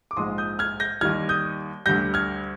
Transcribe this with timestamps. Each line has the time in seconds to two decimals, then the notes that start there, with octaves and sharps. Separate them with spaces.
0.11 D6
0.16 A#1 G#2 F3 G#3 C6 D#6
0.38 D#6 G6
0.59 F6 G#6
0.80 G6 A#6
1.01 D#2 D#3 G3 F6 G#6
1.29 D#6 G6
1.86 D2 D3 G3 G6 A#6
2.14 F6 G#6